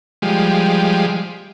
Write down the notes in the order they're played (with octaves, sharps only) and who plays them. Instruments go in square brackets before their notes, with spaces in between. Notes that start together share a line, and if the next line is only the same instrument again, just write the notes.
[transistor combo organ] F3 G3 G#3